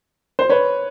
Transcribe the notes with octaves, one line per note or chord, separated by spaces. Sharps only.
C5
B4 C#5